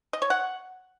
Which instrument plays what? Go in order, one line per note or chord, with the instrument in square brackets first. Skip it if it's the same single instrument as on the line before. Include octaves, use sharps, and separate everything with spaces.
[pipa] D#5
C#5
F#5